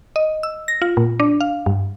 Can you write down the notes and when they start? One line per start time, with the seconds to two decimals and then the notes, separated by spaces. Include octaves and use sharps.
0.16 D#5
0.43 E6
0.68 A#6
0.82 F4
0.97 A#2
1.20 D4
1.40 F5
1.66 G2